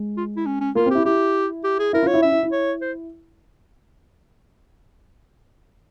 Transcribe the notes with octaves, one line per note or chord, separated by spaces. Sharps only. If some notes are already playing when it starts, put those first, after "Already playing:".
Already playing: G#3
F4
E4
C#4
C#4
A#3 F4
C4
E4 G4
E4 G4
G4
G#4
E4 A#4
F4
C#5
E4
C#4 E5
E4
E4
C#5
C5